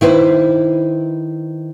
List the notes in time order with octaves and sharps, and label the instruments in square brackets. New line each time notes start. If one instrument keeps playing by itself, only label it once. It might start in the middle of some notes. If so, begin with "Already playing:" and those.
[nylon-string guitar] D#3 E4 B4 C5